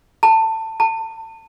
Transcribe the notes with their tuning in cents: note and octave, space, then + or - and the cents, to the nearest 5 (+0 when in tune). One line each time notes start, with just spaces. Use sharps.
A5 +20
A5 +30